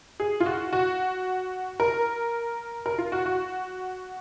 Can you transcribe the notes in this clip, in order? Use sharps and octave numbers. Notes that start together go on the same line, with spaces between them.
G#4
F4
F#4
F#4
A#4
A#4
F4
F#4
F#4